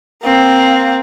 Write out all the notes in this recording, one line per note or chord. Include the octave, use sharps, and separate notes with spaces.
A#3 C4